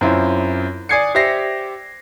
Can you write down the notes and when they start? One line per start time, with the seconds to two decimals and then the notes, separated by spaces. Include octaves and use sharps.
0.01 F#2 C4 E4 F4
0.89 D5 G#5 D#6 G#6 C7 C#7
1.15 G4 C5 D5 E5 A#6 C7